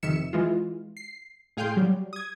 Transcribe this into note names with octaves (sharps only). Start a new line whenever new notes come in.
F2 C3 D#3 E5 C#7 E7
E3 G#3 F4
C7
A2 G#4 F5 G5 C6 G6
F#3 G3
D#6 G#6